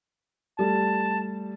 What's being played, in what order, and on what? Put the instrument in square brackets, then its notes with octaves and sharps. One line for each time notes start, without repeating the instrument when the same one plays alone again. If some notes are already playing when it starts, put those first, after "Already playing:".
[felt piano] G3 A3 [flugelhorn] A5